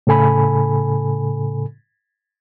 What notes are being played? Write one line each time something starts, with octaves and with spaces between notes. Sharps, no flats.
A2 C#3 A4 G#5 B5